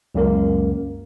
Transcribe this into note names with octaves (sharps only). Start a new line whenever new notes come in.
C#2 F#2 A#3 A#4